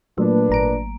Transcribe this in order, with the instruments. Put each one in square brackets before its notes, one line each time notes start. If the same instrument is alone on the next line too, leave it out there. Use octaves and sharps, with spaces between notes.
[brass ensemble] A#2 D4 B4 [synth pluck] F#3 A3 A#3
[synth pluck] G#1 A#5 D7